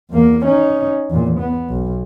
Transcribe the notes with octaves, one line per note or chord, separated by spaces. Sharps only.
E2 A#3
C#4 D#4
E2 A#2
B3
B1